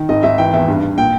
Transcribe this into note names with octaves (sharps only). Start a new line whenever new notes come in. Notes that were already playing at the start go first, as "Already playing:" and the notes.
Already playing: D#3
G#1 D#5
G#1 E5
E3 G5
E2 E5
G2
G2
A#2 G5